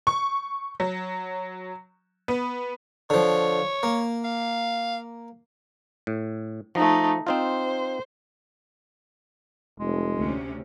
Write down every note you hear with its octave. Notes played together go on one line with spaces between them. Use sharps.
C#6
F#3
B3
D3 F3 C#5
A#3
F5
A2
F3 A3 D#4
C4 D#4 F4 C5
F1 G#3
D2 C3 C#4